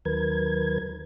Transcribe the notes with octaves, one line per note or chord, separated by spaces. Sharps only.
D#2 D#3 F#3 A#4 B4 G#6